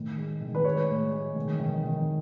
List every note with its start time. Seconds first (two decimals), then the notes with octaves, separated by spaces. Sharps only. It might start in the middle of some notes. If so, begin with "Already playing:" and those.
Already playing: A2 D#3
0.18 G#3
0.41 D#3
0.55 B4
0.65 G#3 C#5
0.89 A2
1.12 G#3
1.36 D#3
1.60 D#3
1.84 D#3